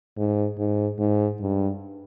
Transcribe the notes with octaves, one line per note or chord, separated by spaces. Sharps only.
G#2
G#2
G#2
G2